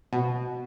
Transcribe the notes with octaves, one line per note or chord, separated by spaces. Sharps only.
B2